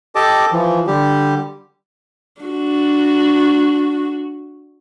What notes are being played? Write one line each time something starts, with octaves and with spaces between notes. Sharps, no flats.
G4 A4 D#5 A5 D6
E3 F3
D3 G3 G4
D4 F#4